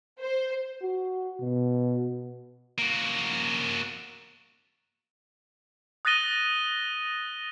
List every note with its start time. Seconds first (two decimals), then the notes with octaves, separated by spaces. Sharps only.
0.21 C5
0.82 F#4
1.40 B2
2.78 A#3 F#4
6.05 D#6 F#6 A6 A#6 D#7 G7